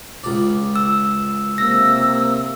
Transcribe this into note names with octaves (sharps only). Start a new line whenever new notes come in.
C#2 D5
E6
C3 A#3 E6 A#6